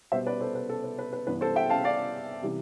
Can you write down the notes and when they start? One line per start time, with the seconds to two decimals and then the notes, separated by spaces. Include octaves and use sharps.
0.12 B2 G3 B3 C5 E5
0.27 B4 D5
0.40 A4 C5
0.55 B4
0.70 A4
0.84 B4
0.99 B4
1.13 B4
1.27 G2 E3 B3 B4
1.41 A4 C5
1.56 E5 G5
1.70 F5 A5
1.84 D5 F5
2.42 C3 E3 G3